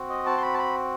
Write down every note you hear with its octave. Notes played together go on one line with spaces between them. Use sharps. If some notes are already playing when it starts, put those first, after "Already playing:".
Already playing: C4 F#4
D#5
A5
C6
B5
A5
B5